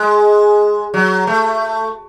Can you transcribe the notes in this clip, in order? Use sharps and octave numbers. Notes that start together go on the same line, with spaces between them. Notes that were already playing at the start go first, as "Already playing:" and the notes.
Already playing: G#3
F#3
A3